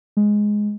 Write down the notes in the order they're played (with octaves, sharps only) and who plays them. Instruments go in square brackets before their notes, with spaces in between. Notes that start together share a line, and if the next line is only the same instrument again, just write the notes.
[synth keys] G#3